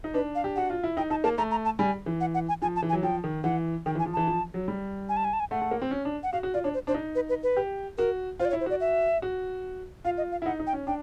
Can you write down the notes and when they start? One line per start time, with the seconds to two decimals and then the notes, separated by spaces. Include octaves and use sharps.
0.04 D#4
0.14 D4 B4
0.35 F5
0.44 G4
0.56 F#4 F#5
0.70 F4
0.83 E4
0.97 D#4 G5
1.10 D#4 A5
1.24 A#3 A5
1.38 A3 A#5
1.51 A#5
1.65 A5
1.79 G3 G#5
2.06 E3
2.20 F#5
2.34 F#5
2.48 G#5
2.62 F3 G#5
2.76 A5
2.82 E3
2.89 G#5
2.93 F#3
3.03 F3 G5
3.24 D#3
3.43 E3 F#5
3.86 D#3 G5
3.95 E3
3.99 G#5
4.06 F3
4.13 E3 A5
4.27 F3
4.54 F#3
4.68 G3
5.09 G#5
5.16 A5
5.24 G#5
5.33 A5
5.40 G#5
5.51 A3 F#5
5.61 A3
5.71 A#3
5.82 C4
5.91 C#4
6.05 D4
6.23 F#5
6.33 F#4 F5
6.43 F#4
6.54 F4 D5
6.64 D4 C#5
6.74 C5
6.87 D4 C5
6.94 D#4
7.15 B4
7.29 B4
7.43 B4
7.57 G4
7.97 F#4 A#4
8.39 F4 C5
8.45 D5
8.50 C#5
8.53 E4
8.60 C5
8.66 F#4 D5
8.80 E5
9.22 F#4
10.05 F4 F5
10.17 D#5
10.32 F5
10.42 E4
10.45 D#4 F#5
10.60 D#4
10.67 G5
10.73 C#4
10.87 D4 G5